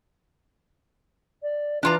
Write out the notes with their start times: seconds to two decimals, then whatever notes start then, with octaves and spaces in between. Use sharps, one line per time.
1.42 D5
1.83 E3 D4 F4 A#5